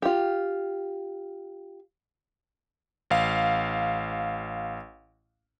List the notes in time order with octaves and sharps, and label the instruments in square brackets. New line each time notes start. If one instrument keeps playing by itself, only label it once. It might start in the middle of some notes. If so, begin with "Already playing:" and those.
[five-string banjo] F4 G4
[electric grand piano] A1 F5